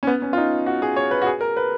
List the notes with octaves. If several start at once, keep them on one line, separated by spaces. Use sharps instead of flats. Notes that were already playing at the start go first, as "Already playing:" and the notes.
C#4
B3
C#4
F4
D#4
F#4
G#4
C#5
B4
F#4
G#4
A#4
B4